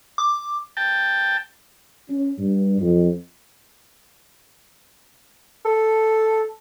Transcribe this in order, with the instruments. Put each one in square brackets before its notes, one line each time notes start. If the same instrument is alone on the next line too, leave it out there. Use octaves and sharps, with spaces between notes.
[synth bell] D6
[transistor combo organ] G5 A5
[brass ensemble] C#4
G2
F2
[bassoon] A4